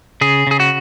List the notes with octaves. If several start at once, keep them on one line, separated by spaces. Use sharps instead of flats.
C#3 G#4
C#3 G#4
F#4